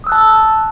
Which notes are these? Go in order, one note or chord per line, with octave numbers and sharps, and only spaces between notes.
A5 D#6 E6 F#6